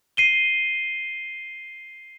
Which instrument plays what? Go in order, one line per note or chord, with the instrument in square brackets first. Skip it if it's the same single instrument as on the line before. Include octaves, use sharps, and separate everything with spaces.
[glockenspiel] C7 D#7 G7